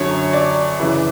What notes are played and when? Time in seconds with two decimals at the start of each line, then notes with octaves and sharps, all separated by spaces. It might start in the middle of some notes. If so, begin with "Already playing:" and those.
Already playing: F#2 D3 F#3 C#5
0.33 D5
0.80 F#2 C#3 E3